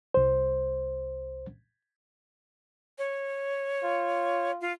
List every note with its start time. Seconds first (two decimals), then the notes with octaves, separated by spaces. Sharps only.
0.14 C2 C5
2.98 C#5
3.83 F4
4.61 F4